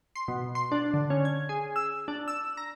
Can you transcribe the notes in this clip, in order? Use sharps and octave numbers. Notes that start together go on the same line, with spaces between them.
C6
B2
C6
D4
D3
C#4
G#6
G#4
E6
D4
E6
A#5